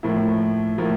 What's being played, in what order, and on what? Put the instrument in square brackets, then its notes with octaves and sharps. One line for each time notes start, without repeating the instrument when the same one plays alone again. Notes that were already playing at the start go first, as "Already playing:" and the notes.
[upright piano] A2 F3 A#3 E4
A2 F3 A#3 E4